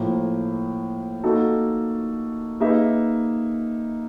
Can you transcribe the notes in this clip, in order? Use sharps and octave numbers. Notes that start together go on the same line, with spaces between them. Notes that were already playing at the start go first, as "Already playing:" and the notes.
Already playing: A2 F3 A#3
A#3 D#4 F#4 A4
A#3 D#4 G#4 B4 E5